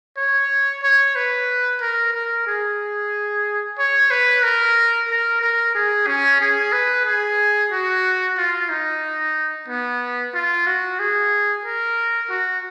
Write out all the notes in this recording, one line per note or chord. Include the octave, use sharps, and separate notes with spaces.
C#5
C#5
B4
A#4
A#4
G#4
C#5
B4
A#4
A#4
A#4
G#4
C#4
G#4
B4
G#4
F#4
F4
D#4
B3
F4
F#4
G#4
A#4
F#4